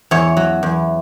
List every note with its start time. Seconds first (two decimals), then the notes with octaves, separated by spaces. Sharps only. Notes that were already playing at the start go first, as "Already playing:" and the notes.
0.11 E2 C#5
0.37 F#3
0.63 E2